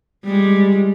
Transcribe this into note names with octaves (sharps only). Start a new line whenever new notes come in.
G3 G#3